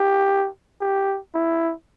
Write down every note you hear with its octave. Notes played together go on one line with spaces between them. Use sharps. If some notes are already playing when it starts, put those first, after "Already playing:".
Already playing: G4
G4
E4